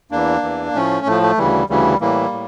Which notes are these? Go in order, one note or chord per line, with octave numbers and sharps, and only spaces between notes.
E2 E3 A#3 D4
E2 E3
A#3
A2 F3 A3 C#4
A2 F3 A3
A3
D2 C#3 E3 G3
D2 C#3 E3 G3
A2 E3 G3 A#3
A2